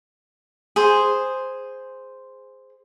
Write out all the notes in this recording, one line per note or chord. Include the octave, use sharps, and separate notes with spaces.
G#4 C5